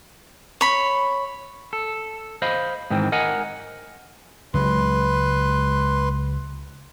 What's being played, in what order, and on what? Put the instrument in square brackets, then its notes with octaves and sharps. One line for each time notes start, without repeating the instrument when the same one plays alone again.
[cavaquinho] C#5 B5
[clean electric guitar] A4
C5 D#5 F5 B5
G#2 D#3 E3 C4
A#4 D#5 F#5 G#5 A#5
[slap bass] C#2 F#3 G#3 [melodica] B4 C6